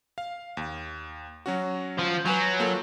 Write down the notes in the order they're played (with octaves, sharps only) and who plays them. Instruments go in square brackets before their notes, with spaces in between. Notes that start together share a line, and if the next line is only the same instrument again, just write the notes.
[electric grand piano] F5
D#2
F#3 C#4 F#4
[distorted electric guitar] F3
[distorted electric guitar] F#3 [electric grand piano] B4 G#5 G6
[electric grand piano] A#3 F4 A4